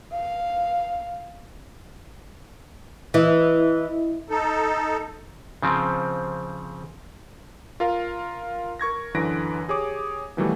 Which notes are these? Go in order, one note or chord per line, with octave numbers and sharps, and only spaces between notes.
F5
E3 E4 D#5 E5
D#4 A4
C#3 F3 C4
F4 A#4 F5
A#4 C#6 G#6 A#6
F#2 D3 E3 B4 A#6 D7
G4 G#4 C#5 D6
B2 D#3 E3 F#3 G3 A3